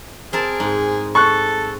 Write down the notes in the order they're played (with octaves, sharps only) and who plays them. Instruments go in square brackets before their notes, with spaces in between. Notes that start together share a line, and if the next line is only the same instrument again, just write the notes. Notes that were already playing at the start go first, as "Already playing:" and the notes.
[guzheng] C4 A#4 A5 [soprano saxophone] G#4
[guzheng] G#2
[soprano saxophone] A4 [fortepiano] C#6 F#6